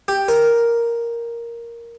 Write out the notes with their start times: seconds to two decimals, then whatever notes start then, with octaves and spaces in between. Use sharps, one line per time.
0.08 G4
0.28 A#4